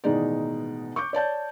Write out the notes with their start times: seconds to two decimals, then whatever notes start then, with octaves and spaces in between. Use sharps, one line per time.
0.04 A1 B2 D#3 G#3 D#4 D5
0.96 C#6 D6 G6
1.13 C#5 D5 A5 G6